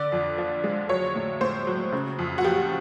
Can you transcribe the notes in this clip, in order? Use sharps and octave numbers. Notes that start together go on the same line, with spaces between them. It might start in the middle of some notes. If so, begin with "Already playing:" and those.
Already playing: D3 D5
F2
F3
G#3
F#3 C#5
A2
A2 C5
F#3
C#3
F2
F#4
F3 G4